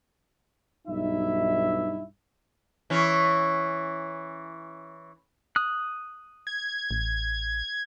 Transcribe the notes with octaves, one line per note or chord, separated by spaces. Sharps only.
B1 G2 B2 D#4 E4 E5
E3 C#4
D#6 F#6
G#6
A1